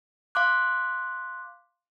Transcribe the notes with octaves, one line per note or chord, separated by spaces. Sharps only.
F5 C6 D6 F#6